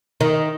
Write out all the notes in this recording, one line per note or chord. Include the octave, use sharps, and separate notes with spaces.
D#3